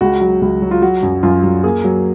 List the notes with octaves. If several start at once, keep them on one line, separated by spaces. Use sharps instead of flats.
C#2 F#4
F#3
C#2
F#3
F4
F#3 F#4
F#2
F#2 F4
F#2
A#3 G#4
F#3